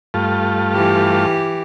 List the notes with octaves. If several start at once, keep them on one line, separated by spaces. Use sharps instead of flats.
G2 A3 F4
E3 G4